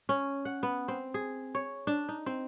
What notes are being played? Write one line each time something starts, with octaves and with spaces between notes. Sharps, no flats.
C#4
F#5
B3
C4
G#4
C#5
D4
D#4
C4